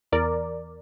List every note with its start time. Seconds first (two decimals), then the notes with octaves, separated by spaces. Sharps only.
0.12 E2 A#4 D5